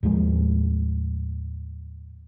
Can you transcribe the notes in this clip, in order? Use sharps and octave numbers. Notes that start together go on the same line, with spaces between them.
D#2 A2 F3 G#3